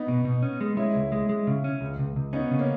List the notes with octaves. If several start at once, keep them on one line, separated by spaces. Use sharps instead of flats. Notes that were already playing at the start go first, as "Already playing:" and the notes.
Already playing: B3 D#4
B2
B2
C#4
G#3
G#3 C#4 E4
C#2
G#3
G#3
C#3
C#4
C#2
C#2
C#2
B3 C#4 D#4
C#3
A#3 C#4